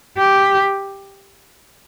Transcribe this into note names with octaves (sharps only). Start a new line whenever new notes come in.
G4